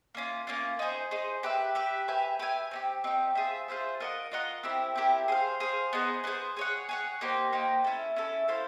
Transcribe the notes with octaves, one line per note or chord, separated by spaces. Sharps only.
A#3 C#4 F4
A#3 C#4 F4
D#4 G#4 C5
D#4 G#4 C5
G4 B4 E5
G4 B4 E5
G4 B4 E5 G#5
G4 B4 E5 G#5
C4 D#4 G4
C4 D#4 G4
F4 G#4 C5 E5
F4 G#4 C5 E5
F4 A#4 D#5 F#5
F4 A#4 D#5 F#5
C4 E4 G4 A#4
C4 E4 G4 A#4
G#4 C5 F5
G#4 C5 F5
B3 D#4 G#4 C5
B3 D#4 G#4 C5
G#4 C#5 F#5
G#4 C#5 F#5
A#3 D#4 G4 C5
A#3 D#4 G4 C5
C#4 E4 A4
C#4 E4 A4
E4 A4 C5 F5